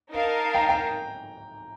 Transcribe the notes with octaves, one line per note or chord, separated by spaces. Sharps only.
D#4 A#4 F5 A5
G5 A#5
G5 A#5